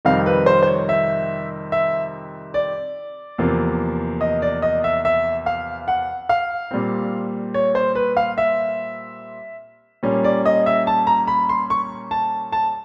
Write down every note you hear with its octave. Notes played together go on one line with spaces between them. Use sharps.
F2 C3 D#3 G3 C4 F5
B4
C5
C5
C#5
E5
E5
D5
E2 C3 F3 A#3
D#5
D5
D#5
E5
E5
F5
F#5
F5
A#2 G3 C4
C#5
C5
B4
F5
E5
A#2 G3 A#3 C#4
D5
D#5
E5
A5
A#5
B5
C6
C#6
A5
A5